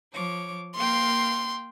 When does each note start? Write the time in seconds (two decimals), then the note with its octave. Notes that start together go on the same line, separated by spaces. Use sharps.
0.13 F3 C#5 D6
0.76 A#3 F5 G5 C6